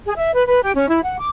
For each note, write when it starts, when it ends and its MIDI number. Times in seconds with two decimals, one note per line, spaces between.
0.05 0.13 68
0.17 0.33 76
0.34 0.44 71
0.48 0.62 71
0.63 0.71 67
0.75 0.87 61
0.88 1.00 64
1.02 1.18 78
1.18 1.30 86